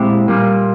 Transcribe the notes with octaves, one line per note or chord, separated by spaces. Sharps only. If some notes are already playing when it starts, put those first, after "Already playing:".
Already playing: A#2 G#3 C4 E4 G4
A#2 G3 A#3